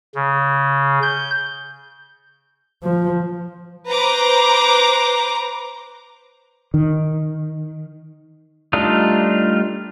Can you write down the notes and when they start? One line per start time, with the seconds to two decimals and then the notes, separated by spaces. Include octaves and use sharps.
0.15 C#3
1.02 G6
2.83 F3
3.89 B4 C5 A#5 D6
6.74 D#3
8.73 G3 A3 D4 D#4 F4